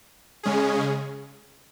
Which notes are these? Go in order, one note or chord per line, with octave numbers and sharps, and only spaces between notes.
C#3 G#3 C#4 G#4